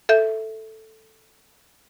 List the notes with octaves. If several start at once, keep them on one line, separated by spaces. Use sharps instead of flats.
A4 E5 G6